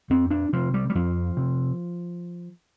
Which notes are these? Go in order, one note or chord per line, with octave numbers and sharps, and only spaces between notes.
F2 C4
D4
C3 F3
G3
G3
F2 F3
C3